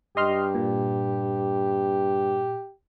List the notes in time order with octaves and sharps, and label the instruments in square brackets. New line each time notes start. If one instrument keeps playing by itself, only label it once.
[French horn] G2 [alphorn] G4 [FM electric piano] D#5 C6 F6
[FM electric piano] A#2